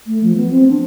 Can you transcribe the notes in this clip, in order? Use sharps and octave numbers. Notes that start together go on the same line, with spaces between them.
A3
F3
B3
C4
D4